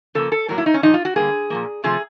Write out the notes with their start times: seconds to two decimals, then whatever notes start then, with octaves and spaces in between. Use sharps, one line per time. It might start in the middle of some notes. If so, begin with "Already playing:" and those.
0.15 C#3 F3 A#3 A4
0.32 A4
0.48 A2 F#3 A#3 A#4
0.58 E4
0.66 D#4
0.74 C#4
0.82 A#2 F3 A#3 D#4
0.94 F4
1.05 F#4
1.16 D3 G3 A#3 G#4
1.50 A#2 F3 A#3
1.84 C3 F3 A3 G#4